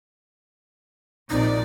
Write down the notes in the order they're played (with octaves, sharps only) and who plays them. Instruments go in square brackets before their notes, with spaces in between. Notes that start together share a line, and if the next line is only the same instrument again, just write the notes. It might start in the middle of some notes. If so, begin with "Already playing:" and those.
[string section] A#1 C3 D5 [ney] D#4